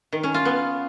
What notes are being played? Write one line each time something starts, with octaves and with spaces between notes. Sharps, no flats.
D#3
C#4
F4
B3